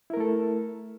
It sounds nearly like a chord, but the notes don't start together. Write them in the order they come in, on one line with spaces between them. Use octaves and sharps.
E4 A#4 A3 A4